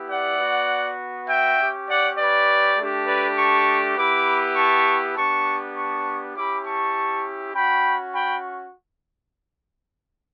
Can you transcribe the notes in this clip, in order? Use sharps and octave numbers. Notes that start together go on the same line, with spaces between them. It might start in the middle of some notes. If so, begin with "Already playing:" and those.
Already playing: B3 E4 G4
D5 F#5
B3 F#4
E5 G5
C#4 G4
D5 F#5
B4 D5
A3 D4 G4
B4 D5
A5 C#6
B3 E4 G4 B5 D6
A5 C#6
B3 D4 G4 A5 C#6
A5 C#6
C#4 E4 G4 B5 D6
A5 C#6
C#4 F#4 G5 B5
G5 B5